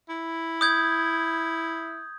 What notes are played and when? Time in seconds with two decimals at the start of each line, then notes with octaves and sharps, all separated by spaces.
0.09 E4
0.61 D#6 G6 G#6